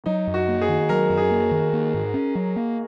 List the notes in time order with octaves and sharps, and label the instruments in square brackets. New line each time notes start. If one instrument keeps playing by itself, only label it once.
[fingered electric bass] F#3 [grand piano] D#4
[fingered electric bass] F#2
[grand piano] F#4
[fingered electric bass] A#3
[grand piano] G#4
[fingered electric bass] D#3
[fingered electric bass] F#3 [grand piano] A#4
[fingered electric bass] F#2
[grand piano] G#4
[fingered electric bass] A#3
D#3
A#3
G#2
C#4
F#3
A#3